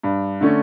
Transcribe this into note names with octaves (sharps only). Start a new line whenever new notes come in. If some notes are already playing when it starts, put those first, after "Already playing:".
G2
D3 A3 C#4